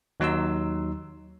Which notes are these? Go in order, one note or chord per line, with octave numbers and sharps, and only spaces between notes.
D#2 F#3 D#4 C6 E6